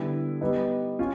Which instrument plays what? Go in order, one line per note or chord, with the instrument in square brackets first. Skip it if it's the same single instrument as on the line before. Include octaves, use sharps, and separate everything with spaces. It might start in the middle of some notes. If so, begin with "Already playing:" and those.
Already playing: [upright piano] D3 G3 B3 E4
G3 B3 D#4
C#4 F4